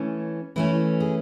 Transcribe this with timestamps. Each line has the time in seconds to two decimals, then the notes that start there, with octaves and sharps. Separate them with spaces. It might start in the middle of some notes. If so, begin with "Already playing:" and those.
Already playing: E3 A3 C#4
0.56 E3 A3 C#4 E4
1.00 G#4